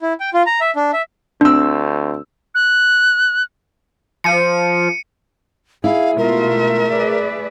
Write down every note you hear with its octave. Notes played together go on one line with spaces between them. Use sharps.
E4
G5
F4
A#5
E5
D4
E5
D2 C4 D4 E6
F#6
F3 C#7 D#7
E4 G#4 F5
B2 G#3 A3 F4 A#4 E5
G#4 B4 D5